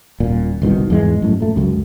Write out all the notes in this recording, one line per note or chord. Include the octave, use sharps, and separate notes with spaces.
D#1 A#2
G1 C2 B2 D#3
E2 G#2 E3 G#3
F#2 A2
A#2 A3
C#2 F#2